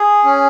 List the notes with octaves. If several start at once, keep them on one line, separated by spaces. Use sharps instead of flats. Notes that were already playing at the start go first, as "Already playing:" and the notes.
Already playing: G#4
C#4